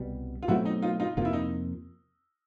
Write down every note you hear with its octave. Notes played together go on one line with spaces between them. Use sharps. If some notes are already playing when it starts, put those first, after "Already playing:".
Already playing: C2 B2 G3
F4
B2 F#3 A3 C4 E4 F#4
D#4
D#4 F4
D#4 F4
F2 C3 F3 A#3 F4
E4
D#4